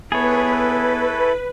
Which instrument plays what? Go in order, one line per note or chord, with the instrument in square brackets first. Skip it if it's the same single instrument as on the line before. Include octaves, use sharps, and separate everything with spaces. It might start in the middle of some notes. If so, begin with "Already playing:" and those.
[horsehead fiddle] B3 [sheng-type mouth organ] E4 A4 [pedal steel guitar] G#4 C#5 [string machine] B4